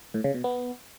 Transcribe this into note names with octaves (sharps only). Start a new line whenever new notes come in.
A2
C#3
B2
B3